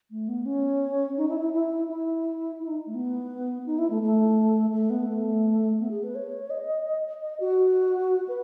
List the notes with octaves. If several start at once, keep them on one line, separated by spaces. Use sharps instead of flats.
A3
B3
C#4
D#4
E4
E4
E4
E4
E4
D#4
A3
B3
D#4
E4
A3
A3
A3
B3
A3
B3
G#4
B4
C#5
D#5
D#5
F#4
B4